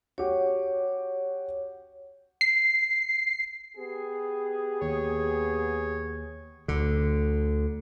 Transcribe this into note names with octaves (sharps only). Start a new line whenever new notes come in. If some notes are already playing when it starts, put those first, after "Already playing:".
F#4 G4 C#5
C7
B3 G4 G#4
D#2 C#5
D2 D3